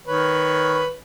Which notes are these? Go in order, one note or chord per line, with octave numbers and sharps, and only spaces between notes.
D#3 B4 C#5